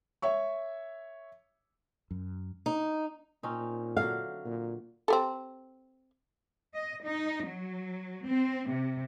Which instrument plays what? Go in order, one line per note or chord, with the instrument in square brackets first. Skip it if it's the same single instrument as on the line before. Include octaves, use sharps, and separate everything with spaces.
[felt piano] C#5 E5 C#6
[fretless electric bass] F#2
[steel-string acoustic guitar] D#4
[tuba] A#2 [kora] C4 C#4 D#4
[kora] D3 F#3 [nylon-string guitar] F5
[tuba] A#2
[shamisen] C4 G4 A4
[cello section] D#5
D#4
F#3
C4
C3